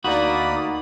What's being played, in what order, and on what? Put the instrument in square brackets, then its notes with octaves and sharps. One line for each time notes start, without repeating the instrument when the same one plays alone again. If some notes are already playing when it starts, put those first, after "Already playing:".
[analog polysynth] D2 D#4 D5 [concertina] A#3 B5 D#6 [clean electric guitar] F#4